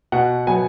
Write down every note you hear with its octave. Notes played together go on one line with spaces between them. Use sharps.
B2 F#5
F#3 B3 G#5